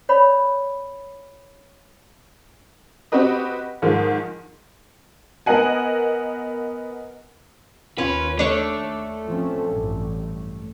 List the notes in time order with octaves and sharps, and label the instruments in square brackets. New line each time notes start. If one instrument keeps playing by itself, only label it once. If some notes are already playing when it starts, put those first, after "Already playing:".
[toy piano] C#5 D5 B5
[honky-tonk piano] C4 F#4 G4 B4 D#5
G#2 D#3 F3 G#3
B3 A#4 D#5 F#5 G#5
[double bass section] D#2 [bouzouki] C#4 F4 [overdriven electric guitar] B4
[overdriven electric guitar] A3 [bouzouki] D4 C#5 [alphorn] A4
[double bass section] F3 C4 C#4
A1 G2